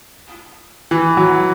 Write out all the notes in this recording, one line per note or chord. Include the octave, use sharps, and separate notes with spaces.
E3
F#3